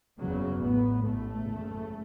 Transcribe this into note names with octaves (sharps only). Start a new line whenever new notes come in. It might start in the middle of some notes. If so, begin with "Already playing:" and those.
F#1 E2 C#3 F#3
A1 A2 B3
A1 A2 A3
F#1 E2 C#3